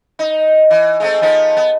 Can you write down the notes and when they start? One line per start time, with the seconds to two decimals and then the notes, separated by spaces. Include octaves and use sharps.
0.19 D#4
0.70 E3
1.00 G#3 A3 C4
1.21 F3 B3 D#4
1.57 B3